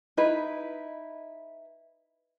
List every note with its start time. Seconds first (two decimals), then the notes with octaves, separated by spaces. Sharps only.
0.17 D#4 E4 B4